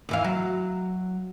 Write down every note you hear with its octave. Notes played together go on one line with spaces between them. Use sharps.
D#2 E3 F5
F#3